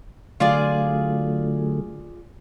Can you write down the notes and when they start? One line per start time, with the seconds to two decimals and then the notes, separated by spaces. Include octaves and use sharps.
0.40 D3 F#3 A3 F4 G#4 D5